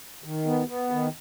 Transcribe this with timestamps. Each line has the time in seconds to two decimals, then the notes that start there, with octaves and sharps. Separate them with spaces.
0.24 D#3
0.46 B3
0.68 B3
0.91 D#3